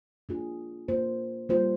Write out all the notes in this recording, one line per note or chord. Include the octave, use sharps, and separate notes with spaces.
A#3 D4 F4 G#4
A#3 F4 C5
G3 A#3 F4 C5